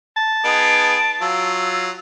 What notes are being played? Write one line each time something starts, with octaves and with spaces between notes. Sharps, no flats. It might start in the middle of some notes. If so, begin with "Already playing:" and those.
A5
B3 D#4 G#4 D7
F#3 F4 E6